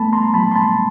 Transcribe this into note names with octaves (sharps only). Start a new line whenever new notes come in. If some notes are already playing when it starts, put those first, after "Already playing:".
Already playing: A3 B3 A5 B5
A#5 C6
F#3 A5 B5
C6
A5 B5